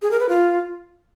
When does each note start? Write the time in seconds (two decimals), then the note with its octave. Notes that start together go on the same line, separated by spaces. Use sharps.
0.02 G#4
0.11 A#4
0.20 B4
0.29 F4